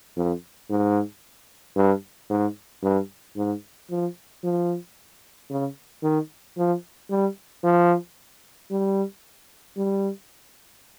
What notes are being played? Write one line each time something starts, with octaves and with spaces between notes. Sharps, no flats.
F2
G#2
G2
G#2
G2
G#2
F3
F3
C#3
D#3
F3
G3
F3
G3
G3